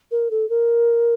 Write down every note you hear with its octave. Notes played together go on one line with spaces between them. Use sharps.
A#4
A4
A#4